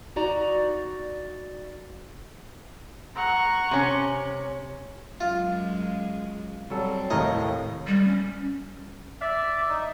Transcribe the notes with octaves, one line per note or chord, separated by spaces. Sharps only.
D#4 F#4 D5 A#5
F#5 A#5 C#6
C3 C#4
F#2 G#3 F4
F#3 G3 C4 A4
D#2 A2 C3 A3 A#4 C#5 D#5
G3
C#4
D5 E5
D#4